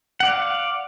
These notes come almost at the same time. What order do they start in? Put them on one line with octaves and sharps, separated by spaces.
F#5 D5 F5